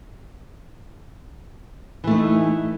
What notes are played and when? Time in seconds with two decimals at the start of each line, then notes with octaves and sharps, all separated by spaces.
2.04 E3
2.07 A3
2.11 D#4